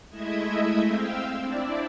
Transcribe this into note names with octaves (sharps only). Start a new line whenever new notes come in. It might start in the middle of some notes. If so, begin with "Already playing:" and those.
G#3 A3 E4 D#5 E5 G#6
C4 F5 G5 E6
C4 D4 E4 D5